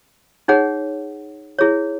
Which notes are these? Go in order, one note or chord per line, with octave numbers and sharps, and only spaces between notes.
D#4 G#4 C#5 F#5
E4 G#4 C#5